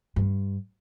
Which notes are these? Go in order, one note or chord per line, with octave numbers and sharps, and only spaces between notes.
G2